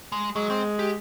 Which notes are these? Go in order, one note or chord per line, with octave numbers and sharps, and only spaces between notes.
G#3
F#3 G#3
C4
G4